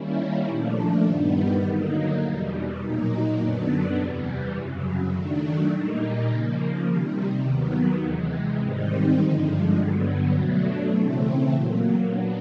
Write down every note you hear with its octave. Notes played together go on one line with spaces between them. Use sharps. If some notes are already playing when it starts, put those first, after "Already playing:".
Already playing: D#3 G3 A#3 C#4 E4
A#2 F3 A3 D4
G2 D#3 G3 B3
D3 F#3 A#3 D#4
E2 B2 G3
A#2 F#3 A#3 D#4
F#2 D3 F#3 B3 D4
E2 C3 E3 G3
F#2 C#3 F#3
D#3 F#3 A3 D4
A#2 G3 A#3 D#4
C#3 F3 A#3
C3 D#3 G3
D#2 D#3 F#3 B3
C3 E3 G#3
G#2 D#3 G3 C4 D#4
G2 D3 F3 G#3
G2 D3 F#3 B3
B2 F#3 A3 D4
C#3 E3 A3 C4
A#2 F#3 A#3
F#3 B3 D4